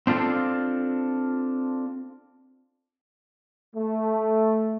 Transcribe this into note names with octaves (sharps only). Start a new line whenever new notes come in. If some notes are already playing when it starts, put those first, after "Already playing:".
C4 D4 F4 A4
A3